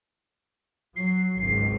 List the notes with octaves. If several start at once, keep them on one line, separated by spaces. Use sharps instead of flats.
F#3 C7
G#1 C#2 C7